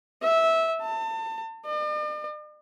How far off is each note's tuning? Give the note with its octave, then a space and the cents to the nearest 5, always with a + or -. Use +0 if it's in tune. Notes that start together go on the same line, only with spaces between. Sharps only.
E5 -15
A5 +30
D5 +45